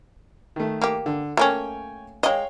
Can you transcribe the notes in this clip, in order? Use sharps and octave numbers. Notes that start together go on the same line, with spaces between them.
D#3 A3
A#3 G4
D3
A3 A#3 C#4 C#5 G5 G#5
G#3 C#5 D#5 F5 G5